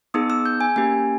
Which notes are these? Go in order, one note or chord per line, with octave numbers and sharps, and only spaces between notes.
B3 D#4 G#4 D#6
E6
G6
G#5
A#3 C#4 G4 G#5